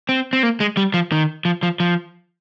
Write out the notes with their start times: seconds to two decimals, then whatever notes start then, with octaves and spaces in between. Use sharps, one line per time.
0.09 C4
0.33 C4
0.43 A#3
0.60 G#3
0.77 G3
0.94 F3
1.12 D#3
1.45 F3
1.63 F3
1.80 F3